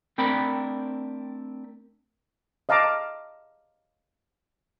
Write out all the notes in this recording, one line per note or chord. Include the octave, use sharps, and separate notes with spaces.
A3 C4 D4 A#4 G5 B5
D#5 F5 A5 A#5 D6